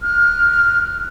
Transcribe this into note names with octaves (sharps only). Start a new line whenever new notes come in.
F6 F#6